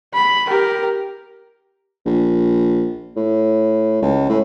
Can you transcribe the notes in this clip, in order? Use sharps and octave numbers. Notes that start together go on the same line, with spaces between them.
B5
G4 A#4
A#1
A2
C#2
A2